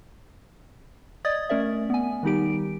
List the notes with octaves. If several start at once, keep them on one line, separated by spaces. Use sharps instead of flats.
D5 D#5 D#6 G#6 A6
A3 C#4 A#4 D5 E5
B3 G#5
D#3 G3 B3 D#4 G4 D7